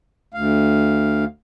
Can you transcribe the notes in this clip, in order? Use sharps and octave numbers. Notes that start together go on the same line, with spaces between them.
D2 F5